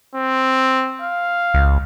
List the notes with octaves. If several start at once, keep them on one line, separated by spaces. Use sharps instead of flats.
C4
F5
C#2